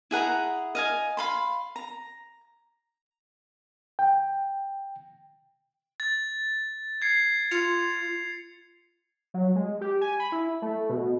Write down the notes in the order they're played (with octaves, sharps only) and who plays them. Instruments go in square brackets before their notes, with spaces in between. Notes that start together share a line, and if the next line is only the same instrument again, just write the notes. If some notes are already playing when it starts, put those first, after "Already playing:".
[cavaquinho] E4 G#4 F#5 A#5
D#5 F5 G#5
F5 B5 C6
A#5
[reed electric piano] G5
[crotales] A6
G#6 C7 C#7
[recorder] F4 [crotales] C#7 F7
[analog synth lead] F#3
G#3
G4
G#5
B5
E4
A3
B2